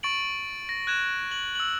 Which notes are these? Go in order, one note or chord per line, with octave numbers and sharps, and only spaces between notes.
C#6 A6 D7 F#7
A#6
F#6 G#6 E7
F#7
E6 F#7